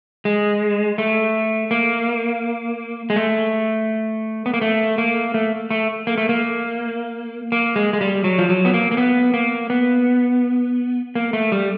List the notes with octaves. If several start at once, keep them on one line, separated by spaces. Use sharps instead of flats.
G#3
A3
A#3
G#3
A3
B3
A#3
A3
A#3
A3
A3
A#3
A3
A#3
A#3
G#3
G#3
G3
F#3
F3
F#3
B3
A#3
A#3
B3
A#3
B3
A#3
A3
G3